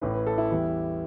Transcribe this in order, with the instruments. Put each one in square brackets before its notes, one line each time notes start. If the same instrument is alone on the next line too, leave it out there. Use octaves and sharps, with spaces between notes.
[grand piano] A1 A2 E3 B4
B4
A4
E4
E2 E3 G3 B3